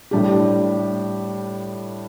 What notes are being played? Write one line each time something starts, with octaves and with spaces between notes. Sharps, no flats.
A2 G3 D4 G4